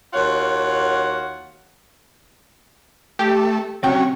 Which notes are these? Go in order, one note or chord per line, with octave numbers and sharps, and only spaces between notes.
D#2 F4 F#4 C#5 F#5
A3 G4
C3 F#3 C#4 G5